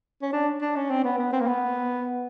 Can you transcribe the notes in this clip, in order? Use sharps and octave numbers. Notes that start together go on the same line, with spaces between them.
C#4
D4
D4
C#4
C4
B3
B3
C4
A#3
B3